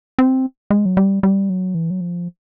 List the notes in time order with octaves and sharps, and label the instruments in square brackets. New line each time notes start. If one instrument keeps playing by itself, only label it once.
[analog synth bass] C4
G#3
F#3
G3
G3
F#3
E3
F#3
F3